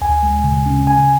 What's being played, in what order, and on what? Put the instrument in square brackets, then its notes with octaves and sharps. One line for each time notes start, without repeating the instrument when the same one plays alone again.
[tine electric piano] D2 G#5
G#3
C#3
C#4
C#3 G#5